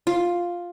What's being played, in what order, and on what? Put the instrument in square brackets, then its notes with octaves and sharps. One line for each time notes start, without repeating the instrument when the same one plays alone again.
[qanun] F4